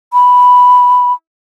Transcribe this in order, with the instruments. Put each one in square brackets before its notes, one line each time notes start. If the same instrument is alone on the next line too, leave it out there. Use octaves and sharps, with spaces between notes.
[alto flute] B5